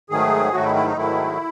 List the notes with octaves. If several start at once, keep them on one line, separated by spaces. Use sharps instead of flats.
G#2 D#3 F#3 A3 G#4
G#2 D#3 F#3 A3 F#4
E4
E4
D#4
G#2 D#3 F#3 A3 E4